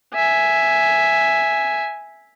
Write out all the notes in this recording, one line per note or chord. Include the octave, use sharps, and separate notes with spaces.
E5 G#5